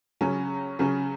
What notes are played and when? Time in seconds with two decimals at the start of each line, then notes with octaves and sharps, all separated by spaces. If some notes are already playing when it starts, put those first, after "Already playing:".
0.21 C#3 F#3 C#4
0.79 C#3 F#3 C#4